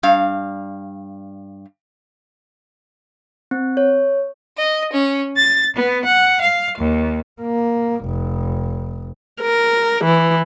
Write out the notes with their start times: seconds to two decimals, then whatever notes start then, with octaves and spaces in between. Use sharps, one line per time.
0.03 G2 F5
3.51 C4
3.77 C#5
4.57 D#5
4.93 C#4
5.37 A6
5.75 B3
6.05 F#5
6.41 F5
6.78 D#2
7.42 A#3
8.05 F1
9.41 A#4
10.05 E3